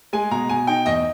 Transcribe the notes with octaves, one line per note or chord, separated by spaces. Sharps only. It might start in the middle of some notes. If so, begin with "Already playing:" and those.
G#3 G#5
B2 A#5
B2 G#5
D#4 G5
E2 D#5